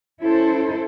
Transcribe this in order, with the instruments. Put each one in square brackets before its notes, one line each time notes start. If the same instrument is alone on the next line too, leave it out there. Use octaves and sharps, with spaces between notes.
[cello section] C#4 E4 A4 C5